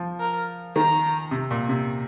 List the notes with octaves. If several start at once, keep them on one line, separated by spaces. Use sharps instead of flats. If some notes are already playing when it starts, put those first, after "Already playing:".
Already playing: F3
A#4
D#3 A#5
C3
A#2
C3